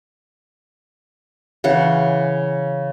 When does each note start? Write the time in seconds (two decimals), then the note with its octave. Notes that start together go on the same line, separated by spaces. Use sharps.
1.64 C#3 E3 F#5